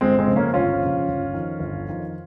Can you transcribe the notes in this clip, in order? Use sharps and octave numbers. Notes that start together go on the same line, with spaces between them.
G1 G#3 C4
G#3 C4
F2 C#3
A#3 C#4
G1 C#4 F4
F2 C#3
G1
F2 D#3
G1
F2 D#3